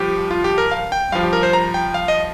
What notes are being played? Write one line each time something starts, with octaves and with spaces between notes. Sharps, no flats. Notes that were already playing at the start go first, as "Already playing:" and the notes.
Already playing: G2 F3 G4
F4
G4
A#4
F5
G5
G2 F3 F5
G4
A#4
C5
A#5
G5
F5
D#5